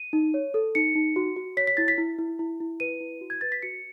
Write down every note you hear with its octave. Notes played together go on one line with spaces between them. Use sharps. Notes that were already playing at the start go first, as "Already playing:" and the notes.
Already playing: D#7
D#4
C#5
A4
D#4 C#7
D#4
F#4
F#4
C#5 B6
B6
E4 A6
B6
E4
E4
E4
E4
B4 D#7
E4
F#4
G#6
B4 A6
B6
F#4 C#7